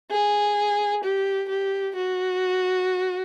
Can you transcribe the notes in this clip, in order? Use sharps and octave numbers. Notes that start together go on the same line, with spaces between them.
G#4
G4
G4
F#4